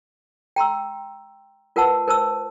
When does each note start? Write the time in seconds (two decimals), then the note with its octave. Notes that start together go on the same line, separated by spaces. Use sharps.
0.56 G5 A#5 C6 E6
1.76 F4 A#4 B4 F#5 A5 E6
2.08 A#4 C5 A5 E6